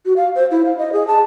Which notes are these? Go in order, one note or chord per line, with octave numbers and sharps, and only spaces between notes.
F#4
F5
C5
E4
F5
D#5
G#4
A5